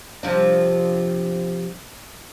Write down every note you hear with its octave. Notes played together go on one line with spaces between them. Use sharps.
C3 F3 D4